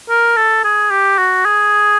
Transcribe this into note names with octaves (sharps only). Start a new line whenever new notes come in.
A#4
A4
G#4
G4
F#4
G#4